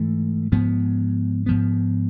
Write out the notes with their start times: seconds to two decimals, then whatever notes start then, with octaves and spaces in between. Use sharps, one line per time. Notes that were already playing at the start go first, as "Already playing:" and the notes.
Already playing: G#2 E3 A3
0.52 G#2 F3 B3
1.46 G#2 F3 B3